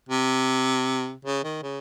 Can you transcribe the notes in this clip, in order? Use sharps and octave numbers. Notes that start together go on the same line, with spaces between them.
C3
C#3
D#3
C#3